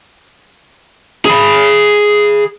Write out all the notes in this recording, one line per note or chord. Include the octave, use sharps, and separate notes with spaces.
G#4 B5